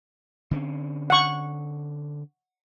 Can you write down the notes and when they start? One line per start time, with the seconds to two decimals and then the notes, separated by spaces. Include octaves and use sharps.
0.51 D3 C4 C#4
1.10 F#5 C#6